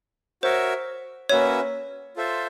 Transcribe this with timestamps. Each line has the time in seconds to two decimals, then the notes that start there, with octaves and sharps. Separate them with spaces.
0.43 F#4 A#4 C5 C#5 E5
1.29 A#3 C#4 F#4 B4 C#5 E5
2.16 F4 A4 C5 E5